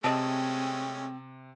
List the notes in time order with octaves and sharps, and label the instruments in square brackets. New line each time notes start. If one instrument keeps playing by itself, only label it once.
[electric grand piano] C3 [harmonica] G#3 A3 C#4 [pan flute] C4 [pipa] D#5 A5